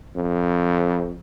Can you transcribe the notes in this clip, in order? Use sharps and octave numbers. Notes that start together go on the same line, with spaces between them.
F2